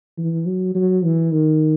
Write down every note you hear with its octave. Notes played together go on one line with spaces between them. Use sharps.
E3
F#3
F#3
E3
D#3